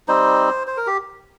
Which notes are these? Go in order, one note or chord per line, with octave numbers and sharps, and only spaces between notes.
G3 C4 D#4 C5
C5
A#4
G4